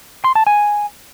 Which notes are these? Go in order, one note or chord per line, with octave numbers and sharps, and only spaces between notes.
C6
A5
G#5